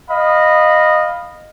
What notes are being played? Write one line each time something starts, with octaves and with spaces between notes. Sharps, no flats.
D#5 F5 B5